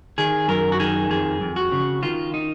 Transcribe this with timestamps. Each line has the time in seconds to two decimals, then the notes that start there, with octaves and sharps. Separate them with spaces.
0.18 D#3 G#4
0.48 F#2 A#4
0.72 F#4
0.80 D#3 G#4
1.10 F2 G#4
1.41 F2
1.56 F#4
1.72 C#3
2.02 D#3 F4
2.34 D#4